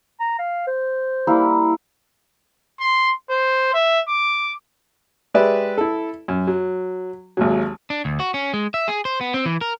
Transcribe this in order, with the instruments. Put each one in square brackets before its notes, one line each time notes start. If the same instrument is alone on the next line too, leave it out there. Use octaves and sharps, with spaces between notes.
[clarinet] A#5
F5
C5
[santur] G3 A#3 E4
[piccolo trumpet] C6
C5
E5
D6
[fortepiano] G#3 G4 B4 D5 E5
E4 A4
F#2
F#3
G#1 D#2 F#3
[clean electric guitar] D4
D2
F#4
C#4
G#3
E5
G#4
C5
B3
C4
E3
A#4